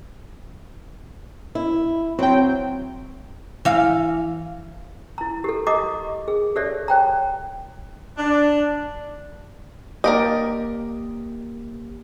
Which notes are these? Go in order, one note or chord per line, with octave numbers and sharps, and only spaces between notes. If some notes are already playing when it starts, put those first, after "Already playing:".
E4
F#3 C4 G5
E3 F5
E4 A#5
G4 A4
G4 D#5 A#5 D6 D#6
G#4
G4 A4 C#5 D5 E5
C#5 G5 A#5
D4
A#3 G4 A#4 D5 D#5